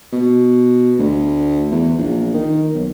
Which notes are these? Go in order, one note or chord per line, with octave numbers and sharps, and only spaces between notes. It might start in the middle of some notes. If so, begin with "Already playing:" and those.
B2
D2
E2
A#1
D#3
B1